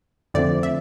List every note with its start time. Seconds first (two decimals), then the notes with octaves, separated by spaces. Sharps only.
0.34 F2 D3 F3 A3 C4 D5
0.63 E5